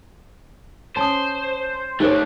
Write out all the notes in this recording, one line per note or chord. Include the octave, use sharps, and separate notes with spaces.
C#4 C5 A5 D#6
A3 D4 D#4 G4 A#4 C5 C#5